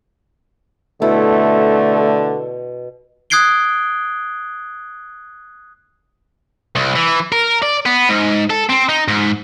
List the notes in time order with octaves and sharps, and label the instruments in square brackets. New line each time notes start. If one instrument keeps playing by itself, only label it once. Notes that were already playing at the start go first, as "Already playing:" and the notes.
[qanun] B2 E4 [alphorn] D3 [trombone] A3
[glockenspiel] D#6 F#6 G#6 C7 D7 G7
[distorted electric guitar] C2
E3
A#4
D5
B3
G#2
A4
C4
D#4
G#2